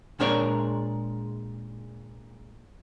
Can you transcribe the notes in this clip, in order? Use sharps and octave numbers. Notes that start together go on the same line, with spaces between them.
A#2 G#3 D4 A#4 C#5 D5